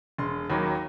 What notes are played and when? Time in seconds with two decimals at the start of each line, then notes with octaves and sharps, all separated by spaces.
0.18 E1 C6
0.50 D#2 D#3 F#3 A#3 B5